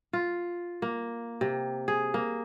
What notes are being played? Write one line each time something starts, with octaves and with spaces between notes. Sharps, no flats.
F4
A#3
C3
G#4
A#3